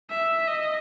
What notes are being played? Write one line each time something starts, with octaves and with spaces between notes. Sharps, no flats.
E5
D#5